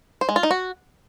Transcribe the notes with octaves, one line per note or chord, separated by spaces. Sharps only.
C5
G#3
F4
D#4
F#4